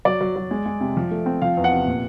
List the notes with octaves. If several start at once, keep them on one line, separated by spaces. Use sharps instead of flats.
F#3 D5
F#3
F#3
G#3
G#3
C3
F3
A3
C4
F3 F5
E2
F#5
C3
A#2